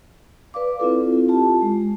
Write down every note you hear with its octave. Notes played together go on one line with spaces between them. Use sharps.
B4 D5 F5 D6
C4 E4 F4 A4
F4 G4 A5
G#3